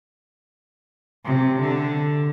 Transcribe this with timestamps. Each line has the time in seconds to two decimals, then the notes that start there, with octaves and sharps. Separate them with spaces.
1.25 C3
1.61 D3